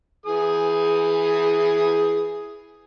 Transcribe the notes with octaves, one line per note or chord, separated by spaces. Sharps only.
E3 G#4 D#6